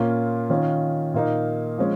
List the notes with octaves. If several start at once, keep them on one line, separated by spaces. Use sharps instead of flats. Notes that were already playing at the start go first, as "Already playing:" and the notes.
Already playing: A#2 A#3 C#4 F4
D#3 C#4 F4
A#2 A#3 D#4
F3 G#3 C#4